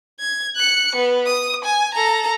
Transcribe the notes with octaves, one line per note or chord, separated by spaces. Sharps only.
G#6
F#6 C#7
B3
D#6
G#5
A4 A#5